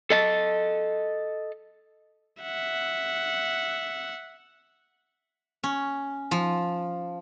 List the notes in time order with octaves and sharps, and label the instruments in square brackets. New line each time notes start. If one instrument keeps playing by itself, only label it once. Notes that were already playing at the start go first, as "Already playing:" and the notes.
[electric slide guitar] A4 D#5 A5
[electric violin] E5 F#5
[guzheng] C#4
F3